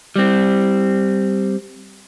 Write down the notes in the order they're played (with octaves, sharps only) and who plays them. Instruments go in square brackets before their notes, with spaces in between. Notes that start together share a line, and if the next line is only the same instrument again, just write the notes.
[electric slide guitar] G3 C4